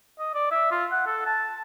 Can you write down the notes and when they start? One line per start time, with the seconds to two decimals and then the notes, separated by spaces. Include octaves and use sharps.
0.19 D#5
0.34 D5
0.52 E5
0.71 F4
0.92 F#5
1.07 A4
1.26 A5